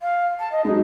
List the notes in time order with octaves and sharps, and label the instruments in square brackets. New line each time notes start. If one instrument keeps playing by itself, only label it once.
[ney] F5
A5
D#5
[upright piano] F#3 G#3 [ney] D#4